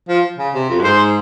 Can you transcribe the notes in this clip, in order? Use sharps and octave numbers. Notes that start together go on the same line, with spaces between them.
F3
C#3
C3
F2
F#2
G#2 C5